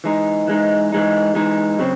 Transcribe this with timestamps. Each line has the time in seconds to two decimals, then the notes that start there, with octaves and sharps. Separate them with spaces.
0.04 E3 G#3 D#4
0.48 E3 G#3 D#4
0.92 E3 G#3 D#4
1.35 E3 G#3 D#4
1.79 C#3 F#3 C4